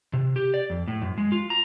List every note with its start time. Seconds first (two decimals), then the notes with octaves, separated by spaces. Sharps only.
0.13 C3
0.36 G4
0.54 D5
0.70 F2
0.88 A2
1.02 F#2
1.18 G#3
1.32 F4
1.50 A#5